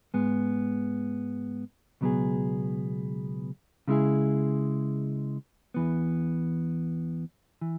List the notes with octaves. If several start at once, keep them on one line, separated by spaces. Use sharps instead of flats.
G#2 G#3 B3
C#2 B2 F#3 B3 G#4
C#3 G#3 E4 G#4
E2 E3 B3
E3